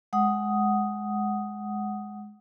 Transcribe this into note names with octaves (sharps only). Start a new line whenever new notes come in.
G#3 F#5 D#6